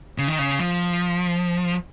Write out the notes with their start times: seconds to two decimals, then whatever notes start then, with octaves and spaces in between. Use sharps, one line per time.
0.18 C#3
0.28 D#3
0.39 C#3
0.60 F3